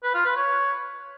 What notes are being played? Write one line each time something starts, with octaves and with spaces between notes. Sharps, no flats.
B4
F4
B4
C#5